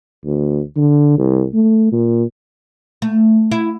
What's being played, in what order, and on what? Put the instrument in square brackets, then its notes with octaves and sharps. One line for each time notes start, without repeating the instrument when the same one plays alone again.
[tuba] D2
D3
C2
A3
A#2
[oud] A3
E4